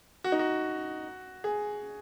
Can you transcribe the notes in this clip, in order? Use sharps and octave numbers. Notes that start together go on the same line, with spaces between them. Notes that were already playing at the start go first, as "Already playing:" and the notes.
F#4
D#4
F#4
G#4